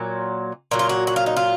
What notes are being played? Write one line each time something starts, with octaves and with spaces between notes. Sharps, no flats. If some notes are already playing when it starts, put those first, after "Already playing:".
Already playing: A#2 F#3
A#2 F#3
F4
F#4
F#4
F4
D#4
F4